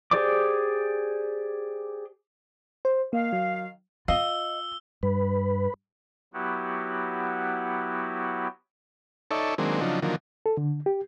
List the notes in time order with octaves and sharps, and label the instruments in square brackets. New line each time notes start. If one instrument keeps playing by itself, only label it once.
[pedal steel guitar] G4 G#4 C5 D5 D6
[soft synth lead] C5
[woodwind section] D#3 F5 [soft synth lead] A#3
[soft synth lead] F#3
[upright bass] F4 [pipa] D#5 [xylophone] F5 [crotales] E6 G7
[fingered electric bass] G2 [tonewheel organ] B4
[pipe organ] F#3 B3 E4 F#4 G4
[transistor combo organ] D#4 A4 C#5 D5 E5
D#3 F#3 G#3 A#3 C4 D4
C#3 F3 F#3 D4 D#4
D3 D#3 F3 F#3 A#3
[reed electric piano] A4
D3
G4